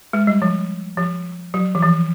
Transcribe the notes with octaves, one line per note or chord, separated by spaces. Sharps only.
G#3
G3
F3
F3
F#3
E3
F3